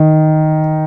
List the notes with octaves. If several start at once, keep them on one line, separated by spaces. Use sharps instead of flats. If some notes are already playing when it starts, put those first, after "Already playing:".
Already playing: D#3